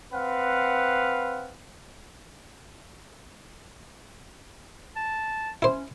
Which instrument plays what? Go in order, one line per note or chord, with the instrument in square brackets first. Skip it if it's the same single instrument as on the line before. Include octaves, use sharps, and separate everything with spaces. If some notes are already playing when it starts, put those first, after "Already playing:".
[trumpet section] C4 B4 F5 F#5
[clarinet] A5
[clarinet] C#4 [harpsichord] E4 C5